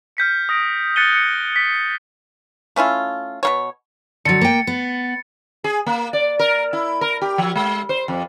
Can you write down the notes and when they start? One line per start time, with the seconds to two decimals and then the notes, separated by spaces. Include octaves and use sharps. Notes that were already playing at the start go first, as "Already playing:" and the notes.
0.17 F6 G6 B6 C#7
0.49 D#6 A#6 D7
0.96 F#6 A6 B6 C#7 D#7 G7
1.13 F#6 C#7
1.56 B6
2.76 A3 C#4 E4 F4
3.43 B2 A#3 C#5
4.25 D3 F#3 A6 C#7
4.41 A#3 G5
4.67 B3
5.64 G#4
5.86 A#3
6.13 D5
6.39 A#4
6.73 E4
7.01 A#4
7.21 G4
7.38 F3
7.56 G#3
7.89 C5
8.08 F2